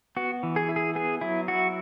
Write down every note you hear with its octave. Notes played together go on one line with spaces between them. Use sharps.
B3 F#4
E3
G#4
E4
G#4
B3 G#4
F#3 E4
E4 F#4